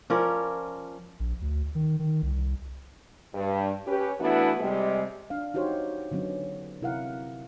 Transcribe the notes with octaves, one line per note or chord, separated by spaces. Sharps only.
F3 C#4 A#4 D5
A#1
D2
D#3
D#3
C2
G2
C#4 G4 B4
E3 A3 B3 D4 E4 F#4
C3 G3 G#3
D4 F5
D#4 F#4 G4 C5 C#5
D3 F#3 B3 C#4
C3 E4 A#4 F5 F#5